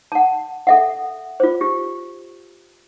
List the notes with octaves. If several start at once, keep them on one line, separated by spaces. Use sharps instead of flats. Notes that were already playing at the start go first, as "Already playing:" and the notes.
F#5 A5
A4 E5 F#5
F4 C5
G4